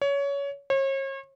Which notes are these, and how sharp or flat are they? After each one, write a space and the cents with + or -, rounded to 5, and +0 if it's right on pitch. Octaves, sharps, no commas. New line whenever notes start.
C#5 +20
C#5 -40